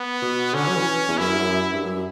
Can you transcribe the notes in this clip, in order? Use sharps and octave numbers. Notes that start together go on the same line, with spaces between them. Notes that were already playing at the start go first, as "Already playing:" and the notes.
Already playing: B3
B2
D3 C#4
F#3
E3
E2
F#2 E4
G2
F#2
G2
F#2